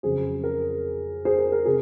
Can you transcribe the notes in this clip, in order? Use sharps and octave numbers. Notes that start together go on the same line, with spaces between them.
F2 C#3 F#3 C#4 G#4 C5
A#4
G#4 C5
A#4
A#4
C3 G#4